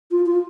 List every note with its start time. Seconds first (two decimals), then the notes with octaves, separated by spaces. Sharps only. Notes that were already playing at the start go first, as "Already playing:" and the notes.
0.12 F4
0.26 F4